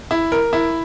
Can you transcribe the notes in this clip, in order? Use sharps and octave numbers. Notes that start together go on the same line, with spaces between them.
E4
A#4
E4